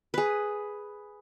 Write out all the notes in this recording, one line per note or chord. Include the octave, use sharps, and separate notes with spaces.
G#4 B4